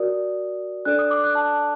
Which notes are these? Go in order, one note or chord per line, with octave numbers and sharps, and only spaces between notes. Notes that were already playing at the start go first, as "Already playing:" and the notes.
Already playing: F#4 A#4 D5 D#6
D4 A4 D5 F#6
D#6
D6
F#6
A5